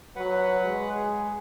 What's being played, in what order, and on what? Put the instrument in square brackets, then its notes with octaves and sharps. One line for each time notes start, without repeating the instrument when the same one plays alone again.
[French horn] F#3 [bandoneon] B4 F#5
[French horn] G#3
[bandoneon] G#4